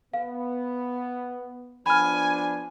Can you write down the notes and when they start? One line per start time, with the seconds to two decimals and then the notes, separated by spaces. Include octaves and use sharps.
0.14 B3 F5
1.86 F3 B3 D4 G#5 B5 F6